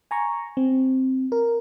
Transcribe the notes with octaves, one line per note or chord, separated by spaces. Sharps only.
G#5 A#5 C#6
C4
A#4